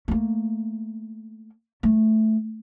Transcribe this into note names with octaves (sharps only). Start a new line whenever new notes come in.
A3 A#3
A3